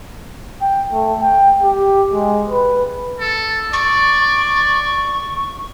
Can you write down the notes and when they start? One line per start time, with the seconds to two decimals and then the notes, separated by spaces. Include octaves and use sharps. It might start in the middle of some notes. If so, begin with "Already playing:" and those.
0.61 G5
0.93 A3
1.21 G5
1.62 G4
2.13 G#3
2.49 B4
3.20 A4
3.73 D5 C#6